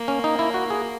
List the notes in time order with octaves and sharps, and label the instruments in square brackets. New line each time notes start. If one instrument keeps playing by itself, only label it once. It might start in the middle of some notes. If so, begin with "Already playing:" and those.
Already playing: [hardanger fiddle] A#3
[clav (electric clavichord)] C#4
D#4
E4
F#4
G#4